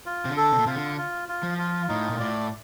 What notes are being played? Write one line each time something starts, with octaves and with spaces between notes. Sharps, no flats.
F4
C3
D3
A4
C3
A#2
C3 F4
D3
F4
F4
F3
F4
A2 D#4
A#2
A2 D5